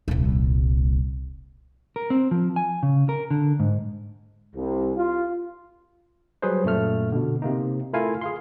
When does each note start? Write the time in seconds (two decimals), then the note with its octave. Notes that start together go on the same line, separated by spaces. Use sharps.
0.08 D#1 C2
1.96 A#4
2.10 C4
2.31 F3
2.56 G#5
2.83 C#3
3.09 A#4
3.31 D3
3.60 G#2
4.55 C2
4.96 F4
6.42 F#3 G3 G#4 B4 C5
6.64 F#2 A#2 A3 F6
7.12 B2 D3
7.42 C3 A#3 D#4
7.93 A3 E4 F4 A#4 F5 G#5
8.21 G#4 F5 C6